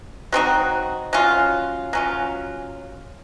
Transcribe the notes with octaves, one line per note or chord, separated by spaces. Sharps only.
F#3 C4 D#4 F#4
F#3 C#4 F4
F#3 C#4 F4